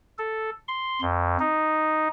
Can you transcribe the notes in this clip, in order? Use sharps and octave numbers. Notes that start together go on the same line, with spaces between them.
A4
C6
F2
D#4